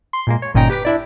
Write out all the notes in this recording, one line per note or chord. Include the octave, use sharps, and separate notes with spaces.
C6
A#2 G#3 A#3
C#5
G1 A#2 C#4 D#4 G5 A#5
G4 B4 D6 B6
D4 E4 D5